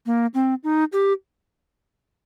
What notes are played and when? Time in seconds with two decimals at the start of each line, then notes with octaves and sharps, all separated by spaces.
0.06 A#3
0.34 C4
0.64 D#4
0.93 G4